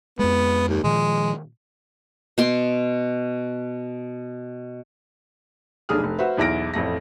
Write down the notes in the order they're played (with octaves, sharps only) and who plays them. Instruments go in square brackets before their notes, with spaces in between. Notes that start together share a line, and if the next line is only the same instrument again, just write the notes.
[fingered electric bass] F2 G#3 [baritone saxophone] B3
[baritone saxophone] D#2
[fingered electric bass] A#2 D#3 F3 [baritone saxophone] G#3
[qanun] B2 C6 D6
[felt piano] F1 B1 D4 G#4 D#6 F6
F1
F#4 B4 C5 E5
B1 E2 E4 F6 A#6 D7
A1 F2 A3 A#6